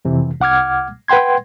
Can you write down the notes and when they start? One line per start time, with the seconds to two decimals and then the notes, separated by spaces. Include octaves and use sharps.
0.05 F2 C3 E3
0.40 C2 F#5 D6 F6 G#6
1.08 B4 F#5 G5 C6 G#6